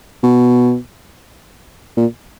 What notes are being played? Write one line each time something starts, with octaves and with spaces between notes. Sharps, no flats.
B2
A#2